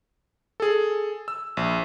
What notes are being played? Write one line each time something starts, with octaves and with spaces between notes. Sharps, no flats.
G#4 A4
E6
A#1